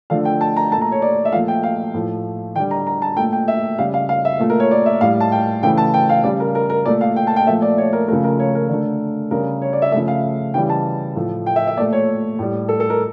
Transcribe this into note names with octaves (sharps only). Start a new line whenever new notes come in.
D3 F3 A3 F5
G5
A5
A#5
A#2 A3 A5
A#5
C#5
D5
E5
A#2 F3 A3 F5
G5
F5
A2 F3 A3
D3 G3 G5
A#5
A#5
A5
A#2 A3 G5
G5
E5
C#3 G3 F5
F5
F5
E5
A#2 A3
A#4
C#5
D5
E5
A2 G3 F5
A5
G5
C#3 E3 A3 G5
A5
G5
F5
C#3 G3 D5
A#4
A#4
A#4
A#2 A3 D5
F5
G5
A5
G5
A#2 F3 A3 E5
D5
C#5
A#4
C#3 F3 A3 A#4
A#4
C#5
A#4
D3 A3
C#3 G3 A#4
C#5
D5
E5
C#3 F3 A3 E5
F5
C#3 E3 G3 G5
A5
A2 F3 A3
G5
E5
E5
A#2 A3 D5
C#5
A2 G3
A4
A4
A#4